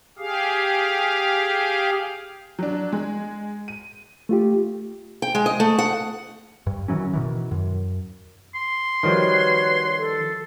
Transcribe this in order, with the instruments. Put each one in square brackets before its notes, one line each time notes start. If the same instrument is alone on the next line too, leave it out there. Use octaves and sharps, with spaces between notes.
[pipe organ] G4 G#4 F5
[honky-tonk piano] F#3 D4
G#3
D#7
[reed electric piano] A3 F4 G4
[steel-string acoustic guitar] G5
G#3
D#5
A3
F#5
[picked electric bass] G2
D#3 E3 F#3 C#4
B2 D#3 E3
F#2
[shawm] C6
[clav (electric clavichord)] D#3 F3 G3 [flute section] F#4 B4 C#5
[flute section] A4